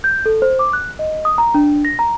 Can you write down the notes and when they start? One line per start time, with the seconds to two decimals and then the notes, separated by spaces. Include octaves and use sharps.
0.04 G6
0.26 A4
0.42 C5
0.59 D6
0.73 F#6
0.99 D#5
1.25 D#6
1.38 A#5
1.55 D4
1.85 A#6
1.99 A#5